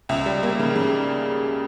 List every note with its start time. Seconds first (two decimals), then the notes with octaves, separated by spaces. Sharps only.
0.09 C#2 E5
0.26 G3
0.43 A#3
0.59 C#3
0.76 C#3